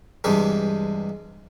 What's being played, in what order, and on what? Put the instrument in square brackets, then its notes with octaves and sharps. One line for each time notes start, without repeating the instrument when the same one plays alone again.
[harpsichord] G2 C3 E3 G#3